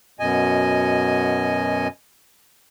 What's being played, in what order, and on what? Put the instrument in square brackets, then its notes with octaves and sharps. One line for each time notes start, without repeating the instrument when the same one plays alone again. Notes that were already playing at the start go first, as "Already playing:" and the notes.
[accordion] F#2 B2 D#5 G#5